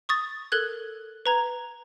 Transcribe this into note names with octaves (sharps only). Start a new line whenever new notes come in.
C#6 D#6 A6
A4 A#4 F#6 G#6
B4 A#5 G#6